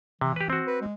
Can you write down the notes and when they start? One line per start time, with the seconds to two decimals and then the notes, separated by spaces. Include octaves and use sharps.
0.21 C3 E3
0.36 G4 B4
0.50 C4 F#4
0.67 B4
0.82 G#3